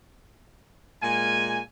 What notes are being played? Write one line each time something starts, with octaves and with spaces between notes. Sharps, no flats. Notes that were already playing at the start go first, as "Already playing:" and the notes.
A#2 G#3 F5 G#5